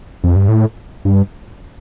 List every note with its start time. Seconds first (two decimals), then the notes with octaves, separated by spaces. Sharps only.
0.24 F2
0.36 G2
0.48 A2
1.05 G2